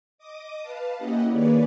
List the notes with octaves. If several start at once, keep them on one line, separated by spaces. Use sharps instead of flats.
D#5 D6 D#6
B4 F5 A5
A#3 C#4 E4 G4 D#5 F#5
D#3 A#3 G#4 B4 C#5 D5